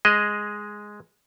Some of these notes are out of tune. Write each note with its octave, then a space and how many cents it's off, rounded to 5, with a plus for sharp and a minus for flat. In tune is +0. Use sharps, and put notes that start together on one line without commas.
G#3 +0 G#4 +0 D#5 +0